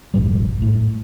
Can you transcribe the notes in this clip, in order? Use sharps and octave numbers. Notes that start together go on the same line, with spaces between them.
F1 A#1 G#2 G3
A2